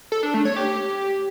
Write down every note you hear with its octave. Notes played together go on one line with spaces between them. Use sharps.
A4
D4
A3
C#5
G4